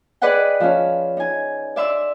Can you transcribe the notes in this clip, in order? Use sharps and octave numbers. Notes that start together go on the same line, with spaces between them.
G#4 B4 D5 D#5 F#5 G5
F3 C#4
D#4 G#5
D5 E5 C6 E6